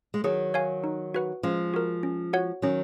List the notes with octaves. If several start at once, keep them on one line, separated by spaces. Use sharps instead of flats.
G#3
D#3 F#3 G#4
C#5 F5 G#5
D#4
F#4 B4 F#5
F3 G#3 C#4
F#4 A#4
C#4
F#4 C#5 F#5
D#3 F#3 C#4